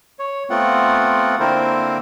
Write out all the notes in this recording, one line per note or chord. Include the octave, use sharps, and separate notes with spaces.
C#5
A3 B3 C4 F4 F#5
D3 A#3 C4 E4 A#4 C5